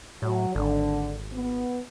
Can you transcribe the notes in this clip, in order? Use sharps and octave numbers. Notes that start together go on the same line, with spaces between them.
A2 F#3
G#1 D3
B3